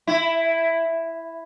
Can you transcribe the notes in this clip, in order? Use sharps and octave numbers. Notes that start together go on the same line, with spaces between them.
E4